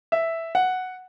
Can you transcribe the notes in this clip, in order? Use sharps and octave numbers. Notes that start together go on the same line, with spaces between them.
E5
F#5